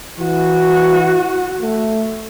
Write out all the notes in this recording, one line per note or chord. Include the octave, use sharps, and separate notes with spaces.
E3 F#4
A3